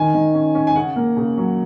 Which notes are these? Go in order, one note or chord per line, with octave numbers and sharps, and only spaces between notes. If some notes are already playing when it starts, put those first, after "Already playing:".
Already playing: D#3 G#5
D#3
C#4
C#4
G#5
C#3 F#5
A#3
C#3
F#3